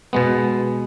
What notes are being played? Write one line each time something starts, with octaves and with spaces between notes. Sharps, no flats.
B2 G#3 B3